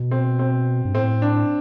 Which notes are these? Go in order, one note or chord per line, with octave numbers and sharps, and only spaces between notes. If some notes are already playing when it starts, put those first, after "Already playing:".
Already playing: B2
C4
C4
G2
A2 C4
D4